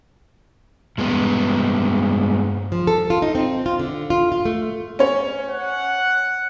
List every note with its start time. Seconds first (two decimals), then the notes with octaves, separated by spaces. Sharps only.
0.98 G2 G#3 B3
2.72 F3
2.87 A4
3.10 F4
3.22 D#4
3.35 C4
3.66 F4
3.79 D3
4.10 F4
4.32 F4
4.45 A3
4.99 C#4 C#5
5.49 F#5